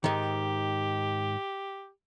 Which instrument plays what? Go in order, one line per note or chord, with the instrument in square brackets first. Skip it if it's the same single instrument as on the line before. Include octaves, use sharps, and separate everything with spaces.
[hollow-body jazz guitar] G#2 D#3 [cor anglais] G4